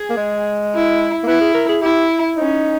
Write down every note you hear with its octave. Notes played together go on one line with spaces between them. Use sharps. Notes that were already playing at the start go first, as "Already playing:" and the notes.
Already playing: G#4
A#3
G#3
E4
A#3
B3 E4
G#4
A#4
G#4
E4 G4
C#4 D#4